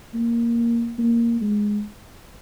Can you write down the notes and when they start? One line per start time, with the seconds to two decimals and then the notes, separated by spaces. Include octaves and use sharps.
0.14 A#3
0.99 A#3
1.41 G#3